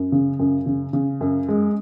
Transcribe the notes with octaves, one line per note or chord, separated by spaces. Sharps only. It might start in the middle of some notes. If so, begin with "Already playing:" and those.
Already playing: F#2
C#3
F#2
C#3
C#3
F#2
G#3